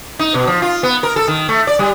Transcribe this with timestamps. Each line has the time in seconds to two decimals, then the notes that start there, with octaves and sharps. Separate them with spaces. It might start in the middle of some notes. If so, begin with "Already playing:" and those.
0.19 D#4
0.34 B2
0.47 F3
0.62 F4
0.83 B3
1.03 A#4
1.16 A4
1.28 D#3
1.49 A3
1.67 D5
1.79 G3